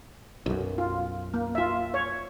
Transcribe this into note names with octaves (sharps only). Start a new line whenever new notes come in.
B1 F#2
F4
A#3
F4 E5
C#5